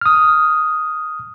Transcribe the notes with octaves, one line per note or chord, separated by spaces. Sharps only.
D#6 F6